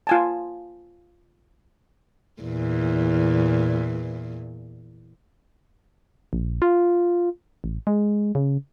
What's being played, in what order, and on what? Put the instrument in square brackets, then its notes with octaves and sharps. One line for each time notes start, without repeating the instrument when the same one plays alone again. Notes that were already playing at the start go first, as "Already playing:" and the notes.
[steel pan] F4 G#5 A5
[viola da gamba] E2 A#2
[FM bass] A#1
F4
A1
G#3
C#3